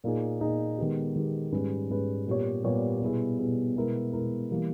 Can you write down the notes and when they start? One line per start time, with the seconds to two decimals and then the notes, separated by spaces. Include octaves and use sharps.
0.04 A#2 A#3 D#4 G#4
0.41 A#2 A#3 D#4 G#4
0.78 D#3 G#3 B3 G4
1.16 D#3 G#3 B3 G4
1.52 G#2 G3 C#4 G#4 B4
1.90 G#2 G3 C#4 G#4 B4
2.27 A#2 G3 B3 G4 C#5
2.64 A#2 G3 B3 G4 C#5
3.02 B2 G3 B3 E4 G#4
3.39 B2 G3 B3 E4 G#4
3.76 B2 G#3 B3 E4 A#4
4.13 B2 G#3 B3 E4 A#4
4.51 E3 G3 A#3